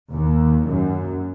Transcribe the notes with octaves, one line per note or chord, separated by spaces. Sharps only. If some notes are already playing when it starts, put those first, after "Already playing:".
D#2
F#2